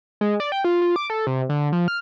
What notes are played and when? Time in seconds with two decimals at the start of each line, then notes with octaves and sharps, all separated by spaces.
0.21 G#3
0.40 D5
0.52 G5
0.64 F4
0.82 F4
0.96 D6
1.10 A4
1.27 C3
1.49 D3
1.72 F3
1.88 F6